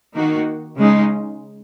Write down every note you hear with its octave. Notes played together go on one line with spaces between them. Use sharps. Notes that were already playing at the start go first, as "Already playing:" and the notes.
D#3 A#3 D#4 F#4
C#3 G#3 D#4